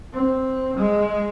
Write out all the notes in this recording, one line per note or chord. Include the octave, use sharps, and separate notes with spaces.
C4
G#3